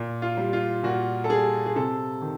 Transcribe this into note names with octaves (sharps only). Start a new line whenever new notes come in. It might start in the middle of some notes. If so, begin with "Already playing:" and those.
Already playing: A#2
F4
G3
F4
A#2 F#4
A4
G3 G#4
G#4
C3 A4
D#3